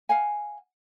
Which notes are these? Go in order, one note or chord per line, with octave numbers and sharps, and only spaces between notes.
F5 F#5 G#5